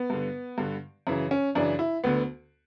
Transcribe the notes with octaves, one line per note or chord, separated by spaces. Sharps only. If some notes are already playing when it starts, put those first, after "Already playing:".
Already playing: B3
G2 D3
G2 D3
F#2 C#3 E3
C#4
F#2 C#3 E3 D4
E4
D2 D3 B3